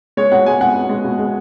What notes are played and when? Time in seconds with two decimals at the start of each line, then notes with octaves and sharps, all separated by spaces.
0.17 G#3 C#5
0.32 B2 F#5
0.46 G#3 G#5
0.61 B2 F#5
0.75 B2
0.89 G#3
1.04 B2
1.19 G#3